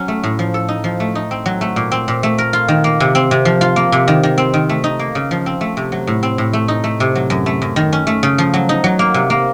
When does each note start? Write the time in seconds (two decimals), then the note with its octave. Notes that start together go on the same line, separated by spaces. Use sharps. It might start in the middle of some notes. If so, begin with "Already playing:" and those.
Already playing: F#3 C#4
0.08 A3
0.23 A2
0.39 F3
0.54 A4
0.68 D#4
0.84 F3
1.00 A3
1.15 D#4
1.31 C4
1.46 F#3
1.61 A3
1.76 A#2
1.92 C4
2.08 A#2
2.23 A3
2.38 A#4
2.53 F4
2.68 D#3
2.84 A#3
3.00 C3
3.15 C4
3.31 C3
3.45 F3
3.61 F4
3.76 A#3
3.92 C3
4.08 D#3
4.23 D#3
4.38 C4
4.54 D#3
4.69 A3
4.84 D#4
4.99 A#3
5.15 C#3
5.31 F3
5.46 C4
5.61 A3
5.77 C3
5.92 F#3
6.07 A2
6.23 C4
6.38 A2
6.53 A3
6.68 D#4
6.84 A3
7.00 C3
7.15 F#3
7.30 F#2
7.46 A3
7.62 F#2
7.76 D#3
7.93 C#4
8.07 A3
8.23 C#3
8.38 F3
8.54 F#3
8.69 D#4
8.84 F#3
8.99 A#3
9.14 C3
9.30 A#3